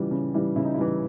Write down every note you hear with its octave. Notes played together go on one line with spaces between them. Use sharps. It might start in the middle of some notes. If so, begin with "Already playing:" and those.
Already playing: C#3 E3 G3 F4
C#3
E3 G3
C#3 E4
D#4
E4
E3 G3